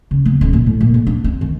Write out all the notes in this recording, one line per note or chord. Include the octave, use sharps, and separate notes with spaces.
C#3
B3
D#1
A#2
A2
A#2
B1
D4
C4
D#3